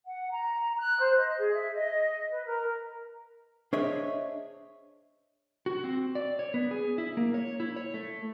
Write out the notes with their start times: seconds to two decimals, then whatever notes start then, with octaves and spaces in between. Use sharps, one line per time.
0.05 F#5
0.31 A#5
0.77 F#6
0.99 C5
1.15 D#5
1.37 G#4
1.53 E5
1.75 D#5
2.30 B4
2.45 A#4
3.73 D4 G#4 C5 C#5 D#5 E5
5.66 F#4
5.84 C4
6.15 D5
6.39 C#5
6.54 B3
6.71 G#4
6.98 E4
7.17 A#3
7.34 C#5
7.60 E4
7.76 C#5
7.94 A3